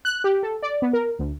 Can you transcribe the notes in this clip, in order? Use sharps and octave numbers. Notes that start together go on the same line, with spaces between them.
F#6
G4
A4
D5
B3
A#4
D2